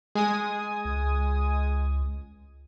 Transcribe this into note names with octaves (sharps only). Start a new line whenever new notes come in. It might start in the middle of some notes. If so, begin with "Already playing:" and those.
G#3 G#5 D#6
C#2